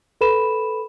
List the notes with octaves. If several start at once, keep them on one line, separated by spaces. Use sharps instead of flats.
A4 B4 B5 E7